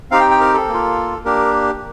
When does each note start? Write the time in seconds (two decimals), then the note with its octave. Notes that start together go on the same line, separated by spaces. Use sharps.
0.11 C4 D#4 G4 F5
0.20 G5
0.31 G5
0.40 A#4
0.54 A4
0.68 A#3 F4
1.25 A#3 D4 G4 A#4